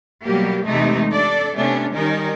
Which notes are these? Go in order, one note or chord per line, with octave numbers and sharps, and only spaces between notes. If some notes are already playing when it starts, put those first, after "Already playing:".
B2 F#3 G3 A#3 G4
E2 C3 E3 G#3 A3 D#4
D4 A4 D5
C3 A3 B3 C#4 D4
D#3 G3 C#4 D#4 A#4